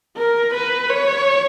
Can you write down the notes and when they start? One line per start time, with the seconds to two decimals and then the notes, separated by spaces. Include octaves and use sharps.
0.17 A#4
0.54 B4
0.90 C#5